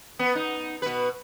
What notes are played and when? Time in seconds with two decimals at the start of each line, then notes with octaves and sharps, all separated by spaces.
0.19 B3
0.35 D#4
0.82 B2 B4